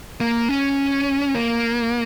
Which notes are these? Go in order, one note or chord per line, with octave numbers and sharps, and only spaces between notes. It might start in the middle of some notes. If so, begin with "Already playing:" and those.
A#3
C#4
A#3